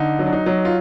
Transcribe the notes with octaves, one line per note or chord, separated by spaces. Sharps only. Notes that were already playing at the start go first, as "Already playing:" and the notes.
Already playing: D3 D#4
F#3
D4
D#4
F#3
F4